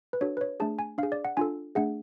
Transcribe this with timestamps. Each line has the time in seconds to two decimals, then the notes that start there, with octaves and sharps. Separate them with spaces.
0.13 B4
0.21 D4 F#4 A4 C#5
0.37 B4
0.41 C#5
0.60 A3 D4 G#4 A5
0.79 G#5
0.98 D4 F5
1.03 G#4
1.12 D5
1.25 F#5
1.37 D4 F4 A4 G#5
1.75 A3 D4 G#4 F#5